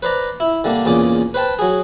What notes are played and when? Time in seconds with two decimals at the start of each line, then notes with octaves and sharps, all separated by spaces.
0.03 B4 C5 D5 A#5
0.40 E4
0.64 D3 G3 A#3 D4
0.85 E2 A#2 C#3 D5 D6
1.34 B4 C5 G5 A5
1.59 F#3 G#4